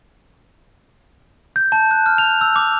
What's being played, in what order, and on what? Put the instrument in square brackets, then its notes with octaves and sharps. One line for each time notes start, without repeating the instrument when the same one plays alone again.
[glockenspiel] G6
A5
F#6
F6
F7
E6
D6